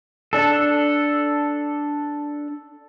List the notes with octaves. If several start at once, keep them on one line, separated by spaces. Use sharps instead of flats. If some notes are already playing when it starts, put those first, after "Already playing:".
D4 A4